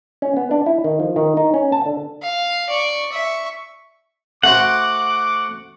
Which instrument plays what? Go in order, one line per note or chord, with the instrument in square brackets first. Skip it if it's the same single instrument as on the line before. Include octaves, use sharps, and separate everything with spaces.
[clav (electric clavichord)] C#4
B3
D4
E4
D#3
F3
D#3
D#4
C#4
A5
D3
[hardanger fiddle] F5
D5 C#6
E5 C#6
[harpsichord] A3 F#4 C5 [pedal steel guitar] F#5 [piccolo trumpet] D6